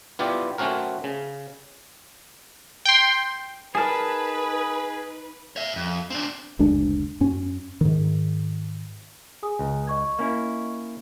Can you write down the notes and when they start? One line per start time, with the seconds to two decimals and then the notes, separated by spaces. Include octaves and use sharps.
0.19 B3 E4 F4 G4 D5
0.58 A3 C4 C#4 F#4 A#4
1.04 C#3
2.85 G5 C6
3.75 D#4 G#4 A#4 B4 G#5 A5
5.56 C#5 E5
5.76 F2
6.10 C4 D4
6.59 F#1 D2 G#3 D4
7.21 F#2 C#4
7.81 G#2 D#3
9.43 G#4 G#5 D#6
9.59 C#2
9.87 D#5 C#6 G#6
10.19 A#3 C#4 E4